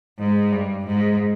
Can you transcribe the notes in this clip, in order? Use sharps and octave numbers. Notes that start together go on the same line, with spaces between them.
G#2
G2
G#2